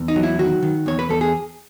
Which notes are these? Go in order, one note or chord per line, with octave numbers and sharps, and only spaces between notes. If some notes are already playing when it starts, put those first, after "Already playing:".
Already playing: E2
D#4
F#3
E4
D#3 F#4
D#3
E2 C#5
B4
E2 A4
G#4